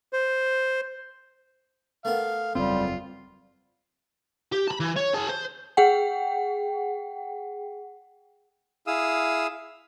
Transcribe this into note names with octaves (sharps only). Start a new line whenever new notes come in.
C5
A3 B3 A#4 F5
F#1 E2 G3 C4 F4
G4
A5 B5
E3
C#5
G#4 A5
C5
G#4 F#5 G5
E4 G#4 F5 D#6 E6